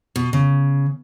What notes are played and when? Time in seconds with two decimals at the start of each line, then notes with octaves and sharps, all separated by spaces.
0.16 B2
0.33 C#3